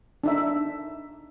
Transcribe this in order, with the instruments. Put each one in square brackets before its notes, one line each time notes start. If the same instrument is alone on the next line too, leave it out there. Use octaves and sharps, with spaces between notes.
[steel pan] D4 D#4 E5